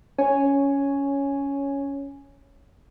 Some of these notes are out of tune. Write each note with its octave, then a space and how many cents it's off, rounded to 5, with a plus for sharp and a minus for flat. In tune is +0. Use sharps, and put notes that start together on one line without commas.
C#4 +10 C#5 +0 G#5 +0